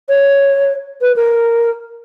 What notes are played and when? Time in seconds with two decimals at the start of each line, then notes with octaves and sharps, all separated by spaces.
0.09 C#5
1.01 B4
1.16 A#4